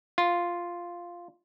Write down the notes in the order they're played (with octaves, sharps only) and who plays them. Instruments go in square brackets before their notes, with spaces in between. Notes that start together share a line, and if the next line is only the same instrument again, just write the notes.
[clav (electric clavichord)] F4